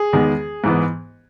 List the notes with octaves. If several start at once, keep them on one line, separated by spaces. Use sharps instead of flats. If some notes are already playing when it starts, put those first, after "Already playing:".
Already playing: G#4
E2 D#3 G#3 B3
G#2 E3 B3